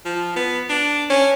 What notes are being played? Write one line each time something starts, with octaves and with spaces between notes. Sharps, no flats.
F3
B3
D4
C#4